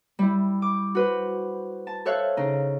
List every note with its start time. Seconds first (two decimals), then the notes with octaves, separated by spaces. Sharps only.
0.19 G3 E4
0.62 D6
0.95 F#4 B4 C5
1.87 A5
2.05 A4 C5 C#5 E5 F5 F#6
2.37 C#3 D#4